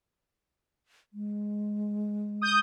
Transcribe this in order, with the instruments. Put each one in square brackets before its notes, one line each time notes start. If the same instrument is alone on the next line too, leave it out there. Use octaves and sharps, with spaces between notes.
[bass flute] G#3
[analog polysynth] D#6 G6